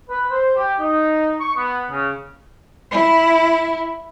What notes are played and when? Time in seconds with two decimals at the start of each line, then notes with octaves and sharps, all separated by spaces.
0.10 B4
0.31 C5
0.56 G4
0.79 D#4
1.39 C#6
1.56 B3
1.90 C#3
2.91 E4